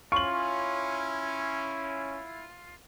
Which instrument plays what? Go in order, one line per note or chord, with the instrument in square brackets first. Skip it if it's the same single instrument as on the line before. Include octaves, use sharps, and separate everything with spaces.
[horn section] C#4 [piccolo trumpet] E4 [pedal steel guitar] F4 [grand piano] C#6 F#7